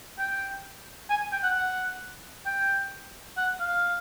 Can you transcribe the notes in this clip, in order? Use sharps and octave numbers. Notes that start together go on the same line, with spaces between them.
G5
G#5
G5
F#5
F#5
G5
F#5
F5